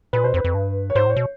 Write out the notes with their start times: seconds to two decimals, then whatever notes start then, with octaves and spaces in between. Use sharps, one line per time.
0.13 A#2 B4
0.24 B2 C5
0.34 F2
0.37 B4
0.44 F2
0.54 G2
0.90 C#5
0.95 G#2 C5
1.06 A2 C#5
1.16 B2